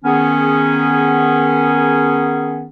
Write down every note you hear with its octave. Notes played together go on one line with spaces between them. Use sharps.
D#3 B3 C#4 G#4